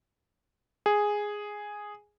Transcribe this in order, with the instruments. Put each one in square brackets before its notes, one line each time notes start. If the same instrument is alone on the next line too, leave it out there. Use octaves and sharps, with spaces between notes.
[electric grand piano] G#4